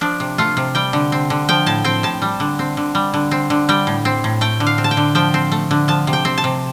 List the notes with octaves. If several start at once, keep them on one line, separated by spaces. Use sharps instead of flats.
F3 D4
C3
A3 F4
C3
G3 G5
D3
C4
D3
F3 G5
A2 A5
C4 G5
A2 A5
G3
D3
C4
D3
G3
D3
C4
D3
G3 G5
A2
C4
A2
A3 G5
D3
F5
C4
A5
G5
D3
F3 G5
C4
A3
D3
F3 A5
C3
G5
C4
A5
C3